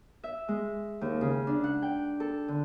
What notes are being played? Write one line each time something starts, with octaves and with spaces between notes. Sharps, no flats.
E5
G#3
D#2
C#3
D4
F#5
G5
A4
D3